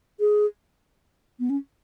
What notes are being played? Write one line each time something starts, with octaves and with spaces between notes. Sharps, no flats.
G#4
B3
C#4